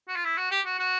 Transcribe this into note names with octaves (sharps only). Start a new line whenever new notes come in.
F#4
F4
E4
F#4
G4
F#4
F#4